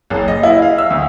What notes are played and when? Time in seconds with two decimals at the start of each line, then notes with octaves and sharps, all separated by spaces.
0.10 F#1
0.28 D#5
0.43 E4
0.62 F5
0.78 E6
0.90 D2